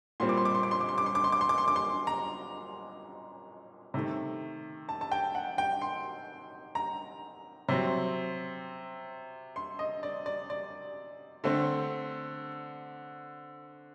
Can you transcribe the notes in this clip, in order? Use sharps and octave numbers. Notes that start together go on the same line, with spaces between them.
A#2 G3 C4 C6
D6
C6
D6
C6
D6
C6
D6
C6
D6
C6
D6
C6
D6
C6
D6
C6
D6
C6
A#5
C3 D#3 A3
A5
A5
G5
F#5
G5
C6
A#5
C3 F#3 C4
C6
D#5
D5
D5
D5
D3 A3 C4